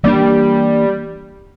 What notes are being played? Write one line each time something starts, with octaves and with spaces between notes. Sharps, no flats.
E3 G3 A#3 D4